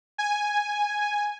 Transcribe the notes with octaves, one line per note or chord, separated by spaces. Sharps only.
G#5